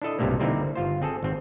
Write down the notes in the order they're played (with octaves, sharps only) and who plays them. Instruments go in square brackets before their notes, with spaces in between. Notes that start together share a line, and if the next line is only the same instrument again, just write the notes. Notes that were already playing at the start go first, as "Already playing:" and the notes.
[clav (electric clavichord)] D4 E4 A4 D#5
B1 G2 C3 G3 A3 A#3
D3 G3 A#3 C4 D#4 E4
G1 F4 C5
C4 G#4 A4
G#1 C4